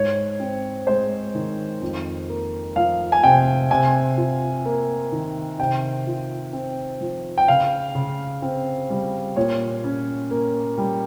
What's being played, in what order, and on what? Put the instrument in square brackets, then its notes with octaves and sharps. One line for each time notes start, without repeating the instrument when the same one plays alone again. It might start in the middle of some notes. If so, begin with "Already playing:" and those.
Already playing: [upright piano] G#2 [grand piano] C#5
[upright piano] C4
[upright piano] G#3 [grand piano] C5
[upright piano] D#3
F2
A#3
[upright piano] F3 [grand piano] F5
[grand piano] G#5
[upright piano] C3 [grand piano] G5
[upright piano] C3 [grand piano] G#5
[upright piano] F4
A#3
D#3
[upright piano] C3 [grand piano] G5
[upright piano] F4
C4
F3
[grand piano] G5
[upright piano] C#3 [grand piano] F5
[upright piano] C#3
C4
G3
[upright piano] A#2 [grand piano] C#5
[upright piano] C#4
A#3
G3